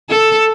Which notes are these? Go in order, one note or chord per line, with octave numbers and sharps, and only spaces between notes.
A4